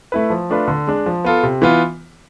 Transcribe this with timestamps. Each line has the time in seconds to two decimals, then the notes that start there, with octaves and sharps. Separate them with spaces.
0.12 A3 E4 B4
0.30 F3
0.50 A3 D4 F4 B4
0.68 D3
0.87 G#3 D4
1.06 F3
1.24 B3 F4 A4
1.43 C3
1.62 E3 B3 F4